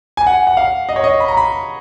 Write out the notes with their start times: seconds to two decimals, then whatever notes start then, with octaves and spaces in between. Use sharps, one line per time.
0.17 G#5
0.27 F#5
0.47 F#5
0.57 F5
0.89 D#5
0.96 C#5
1.04 D#5
1.20 B5
1.28 A#5
1.37 B5